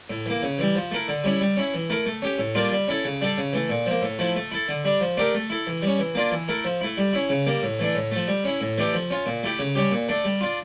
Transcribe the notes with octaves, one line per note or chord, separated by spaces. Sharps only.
A2
E3 A#3
C#3
E3 G3
F3
A3 E4 A#4
D3
G3 C#4 E4
G3
C#4 E4
E3
A3 E4 A#4
A3
C#4 G4
A2
G3 A#3 D4 F4
G3
C#4 E4 A4
C#3
G3 D4 A4
C#3
E3 A3
A#2
F3 A#3
A2
F3 A3 E4
A3
E4 A4
D3
G3 D4
F3
A3 D4 G4 A#4
A3
E4 A4
E3
G3 C#4
E3
A#3 D4 F4
E3
A3 E4 A#4
F3
A3 E4
G3
C#4 E4
C#3
G3 A#3
A2
E3 A3 D4
A2
F3 A3
G3
C#4 E4
A2
E3 A3 D4 G4
F3
C#4 F4
A#2
A3 E4 G4
C#3
G3 C#4 G4
A#2
A3 D4
G3
D4 F4